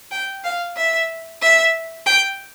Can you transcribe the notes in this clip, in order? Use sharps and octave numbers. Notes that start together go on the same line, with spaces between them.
G5
F5
E5
E5
G5